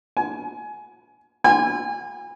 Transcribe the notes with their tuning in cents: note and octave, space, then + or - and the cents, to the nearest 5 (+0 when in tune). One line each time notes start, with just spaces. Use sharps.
G#5 +20
G#5 -35